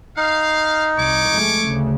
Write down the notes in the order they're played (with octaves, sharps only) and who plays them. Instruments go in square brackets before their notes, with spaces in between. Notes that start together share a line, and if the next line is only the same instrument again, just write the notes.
[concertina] D#4 [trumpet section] F5
[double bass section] C2 [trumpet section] C#5 C#6 D6
[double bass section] F1 G#3 A3
D2 C#3